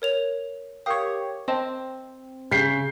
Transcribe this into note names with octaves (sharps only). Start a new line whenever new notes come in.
A#4 C#5 F7
G4 A#4 C#5 F5 D#6
C4 D#5 A5
C#3 G6 B6 C7